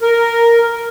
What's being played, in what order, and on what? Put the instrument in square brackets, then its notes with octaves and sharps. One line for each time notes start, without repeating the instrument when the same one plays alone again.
[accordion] A#4